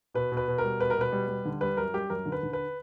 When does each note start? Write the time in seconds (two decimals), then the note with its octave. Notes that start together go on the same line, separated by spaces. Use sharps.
0.14 B2 B4
0.32 B2
0.37 B4
0.48 B2
0.58 A#4
0.64 G3
0.80 B2 B4
0.90 A#4
0.97 B2 B4
1.12 G3
1.28 G3
1.45 D3
1.61 G3 B4
1.77 F#2 A#4
1.94 G3 G4
2.10 F#2 A#4
2.26 D3
2.32 B4
2.43 D3
2.53 B4